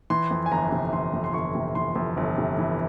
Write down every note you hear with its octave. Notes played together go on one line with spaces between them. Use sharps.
E3 C6
F2
G#5
G1 A#5
C3
E3 C6
F2
C6
G1 C#6
C3
E3 C6
F2
G1
C3
E3